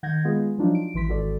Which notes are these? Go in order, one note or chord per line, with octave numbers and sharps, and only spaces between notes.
D#3 F#5 G6 G#6 A#6
G#3 B3 F4 G#4
F3 F#3 D4 D#4 F4 F#4
D7
A1 E3 C6 B6
G#1 F#4 A4 D5